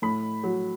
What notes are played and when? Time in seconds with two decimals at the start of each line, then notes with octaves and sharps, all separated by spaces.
0.02 A2 B5
0.44 F#3